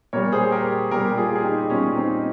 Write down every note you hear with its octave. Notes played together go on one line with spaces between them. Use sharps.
A#2 G3 A#4 C#5
G#4 C5
G4 A#4
A#2 G3 G4 A#4
F4 G#4
G#4
D#4 G4
A#2 G3 C#4 F4
C4 D#4